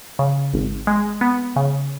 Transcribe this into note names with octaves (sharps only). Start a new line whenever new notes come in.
C#3
G#1
G#3
B3
C#3